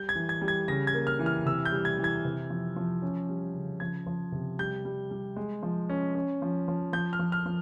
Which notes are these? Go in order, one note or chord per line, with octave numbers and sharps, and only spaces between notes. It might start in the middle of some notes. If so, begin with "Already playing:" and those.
Already playing: G3 G6
G#6
E3
G#6
G3
G#6
C#3 A#6
G#6
A#3
F6
E3
F6
C3 E6
G6
G3
G#6
E3
G#6
C3
F3
F3
C#4
G3
C#3
F3 G#6
F3
C3
G3 G6
G3
G3
G#3
F3
C#4
C#4
F3
F3
F3 G6
F6
F3
F6
F3